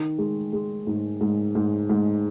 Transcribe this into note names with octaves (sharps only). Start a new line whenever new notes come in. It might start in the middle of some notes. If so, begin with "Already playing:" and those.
Already playing: D#3
G#3
G#3
G#2
G#2
G#2
G#2